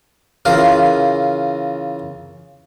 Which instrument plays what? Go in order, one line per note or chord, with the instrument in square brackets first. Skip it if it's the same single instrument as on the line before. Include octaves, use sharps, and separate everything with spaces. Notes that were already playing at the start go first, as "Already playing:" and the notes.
[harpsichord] C#3 E3 F4 A#4